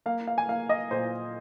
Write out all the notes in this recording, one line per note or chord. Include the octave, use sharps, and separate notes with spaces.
A#3 F5
F5
G#5
A#3 F5
D#5
A#2 C5